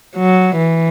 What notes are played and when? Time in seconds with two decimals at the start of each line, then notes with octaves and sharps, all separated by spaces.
0.16 F#3
0.57 E3